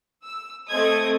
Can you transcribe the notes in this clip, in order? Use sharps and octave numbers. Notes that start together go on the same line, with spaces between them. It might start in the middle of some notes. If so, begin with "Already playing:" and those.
E6
A3 C4 A4 D#5 D#6 G#6